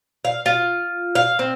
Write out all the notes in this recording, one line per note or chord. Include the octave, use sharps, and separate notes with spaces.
F5
F4
F5
C4